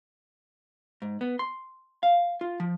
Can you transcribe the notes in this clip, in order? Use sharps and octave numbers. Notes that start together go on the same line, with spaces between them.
G#2
B3
C6
F5
F4
F3